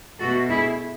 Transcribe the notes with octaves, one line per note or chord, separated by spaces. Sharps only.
B2 A3 F#4 A4
E4 G#4